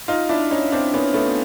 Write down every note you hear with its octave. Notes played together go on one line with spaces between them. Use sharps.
D#4 F4
D4 E4
C#4 D#4
C4 D4
B3 C#4
A3 B3